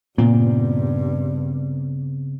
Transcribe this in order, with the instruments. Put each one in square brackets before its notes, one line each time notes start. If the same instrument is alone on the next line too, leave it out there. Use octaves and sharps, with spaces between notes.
[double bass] G2 [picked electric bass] A#2 [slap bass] C#3 B3 C4